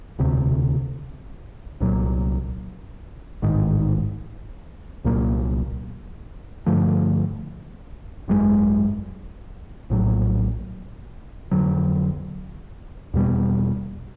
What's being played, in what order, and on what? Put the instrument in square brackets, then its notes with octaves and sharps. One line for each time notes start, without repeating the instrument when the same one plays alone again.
[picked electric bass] E1 D2 C3
C2 A#2 F#3
A1 G#2 D#3
C2 A#2 F#3 A#3
G2 D3 F3 A3
G#1 F#2 D#3 G#3
A#1 A2 F#3
F2 D3 F#3
E2 B2 G3